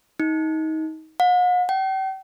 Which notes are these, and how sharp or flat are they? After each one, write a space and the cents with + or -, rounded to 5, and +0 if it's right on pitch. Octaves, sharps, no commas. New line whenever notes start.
D#4 +25
F#5 -45
G5 -40